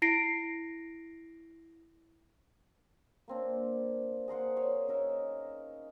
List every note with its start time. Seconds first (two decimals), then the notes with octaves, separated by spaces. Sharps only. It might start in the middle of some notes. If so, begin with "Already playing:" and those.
0.02 E4 A#6 C7 D7
3.28 A#3 C4 D4
4.28 G#4 A#4 C5 F#5
4.57 C#5 F5 G#5
4.88 C#4 D#4 A#4 E5